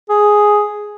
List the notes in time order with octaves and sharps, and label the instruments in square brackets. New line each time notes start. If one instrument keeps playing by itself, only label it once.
[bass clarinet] G#4